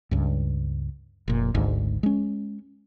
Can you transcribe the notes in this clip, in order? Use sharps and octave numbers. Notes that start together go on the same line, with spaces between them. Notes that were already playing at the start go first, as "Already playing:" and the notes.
C#2 G2
F1 A#2
G#1 D2 G#2
G#3 C#4